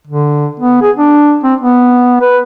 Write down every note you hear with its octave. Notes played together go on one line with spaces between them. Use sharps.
D3
B3
G#4
D4
C4
B3
B4